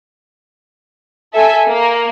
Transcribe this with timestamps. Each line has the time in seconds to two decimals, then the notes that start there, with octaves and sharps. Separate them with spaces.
1.33 A4 E5 G#5
1.66 A#3